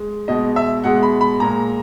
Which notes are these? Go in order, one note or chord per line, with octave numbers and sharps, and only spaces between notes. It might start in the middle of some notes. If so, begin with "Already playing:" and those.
Already playing: G#3
B2 G#3 D#5
E5
B2 G#3 F#5
B5
B5
A#2 G#3 A#5